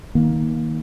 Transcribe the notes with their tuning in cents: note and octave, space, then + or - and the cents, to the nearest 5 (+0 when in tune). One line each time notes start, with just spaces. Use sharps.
D#3 +20 A#3 +15